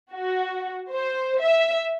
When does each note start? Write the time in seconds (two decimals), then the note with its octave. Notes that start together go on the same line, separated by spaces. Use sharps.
0.13 F#4
0.92 C5
1.41 E5